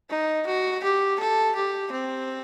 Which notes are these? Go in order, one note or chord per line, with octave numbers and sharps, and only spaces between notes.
D#4
F#4
G4
A4
G4
C4